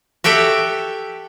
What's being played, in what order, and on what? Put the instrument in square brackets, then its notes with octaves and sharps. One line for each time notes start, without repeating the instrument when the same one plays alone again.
[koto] F#4 G4 A4 E5 G5